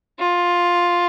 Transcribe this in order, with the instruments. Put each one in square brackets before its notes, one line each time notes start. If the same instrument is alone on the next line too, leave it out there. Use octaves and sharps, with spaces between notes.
[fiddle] F4